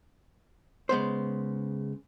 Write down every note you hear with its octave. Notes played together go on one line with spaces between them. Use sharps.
C#3 G#3 B3 C5